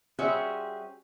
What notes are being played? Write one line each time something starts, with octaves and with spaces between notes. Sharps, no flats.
G3 C#4 F#4 G#4 C5 E5